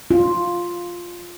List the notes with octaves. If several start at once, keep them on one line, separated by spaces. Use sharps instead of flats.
F4